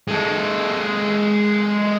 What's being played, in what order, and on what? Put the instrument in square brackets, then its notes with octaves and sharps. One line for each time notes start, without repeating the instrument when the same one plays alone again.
[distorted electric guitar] G#3 A4